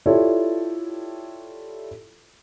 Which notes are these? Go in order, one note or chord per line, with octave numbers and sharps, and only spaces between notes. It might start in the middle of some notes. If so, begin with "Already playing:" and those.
E4 F4 G4 A4 C#5 D5